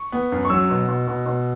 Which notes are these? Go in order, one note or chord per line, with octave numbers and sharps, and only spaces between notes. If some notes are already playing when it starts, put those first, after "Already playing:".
Already playing: C#6
B3
F#2
C#6
F#3 E6
B2
B2
B2
B2